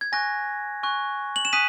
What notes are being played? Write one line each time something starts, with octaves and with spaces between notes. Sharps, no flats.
G#6
G#5 C#6 F#6 A#6
G#5 C#6 F#6
F#7
E7
G#5 D#6 F#6 B6 D#7